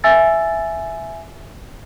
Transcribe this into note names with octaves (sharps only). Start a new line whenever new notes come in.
E5 G#5 E6 A6